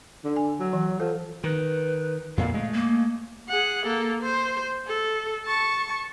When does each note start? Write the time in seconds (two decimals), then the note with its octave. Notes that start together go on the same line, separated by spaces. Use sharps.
0.25 D3
0.36 G#5
0.60 F#3
0.73 E3
1.00 F3 A4
1.44 D#3 B4
2.37 F2 A#2 D3 F5
2.54 G#3 A3
2.73 A#3
3.49 G#4 F#5
3.85 A#3 A4
4.22 C5
4.87 A4
5.45 A5 C#6